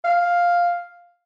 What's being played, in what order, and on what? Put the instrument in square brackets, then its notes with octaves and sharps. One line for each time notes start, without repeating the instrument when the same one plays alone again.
[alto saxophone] F5